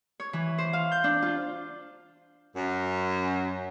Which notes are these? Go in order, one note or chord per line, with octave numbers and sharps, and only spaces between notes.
C#5
E3
C5
F5
G6
D4
F4
F#2